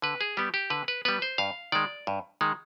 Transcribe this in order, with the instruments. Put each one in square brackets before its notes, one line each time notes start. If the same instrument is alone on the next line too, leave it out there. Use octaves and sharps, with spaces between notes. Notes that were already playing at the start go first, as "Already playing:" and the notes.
[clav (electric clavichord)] D3 B4
G#4
G3 B3 G4
G4
D3 B4
B4
G3 B3 B4
C5
G2 F5
D#3 G#3 D5
G2
D#3 G#3